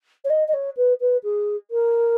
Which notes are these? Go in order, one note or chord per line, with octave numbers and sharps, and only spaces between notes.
C#5
D#5
D#5
C#5
B4
B4
G#4
A#4